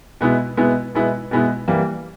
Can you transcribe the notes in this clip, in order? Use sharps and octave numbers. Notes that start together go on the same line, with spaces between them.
B2 G#3 B3 E4
B2 G#3 B3 E4
B2 G#3 B3 E4
B2 G#3 B3 E4
E3 G3 A#3